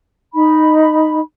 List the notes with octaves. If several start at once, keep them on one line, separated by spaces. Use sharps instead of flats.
D#4 B5